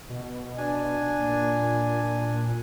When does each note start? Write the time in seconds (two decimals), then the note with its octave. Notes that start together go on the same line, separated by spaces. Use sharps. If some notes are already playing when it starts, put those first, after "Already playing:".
0.10 B2
0.57 D4 G#5
1.19 A#2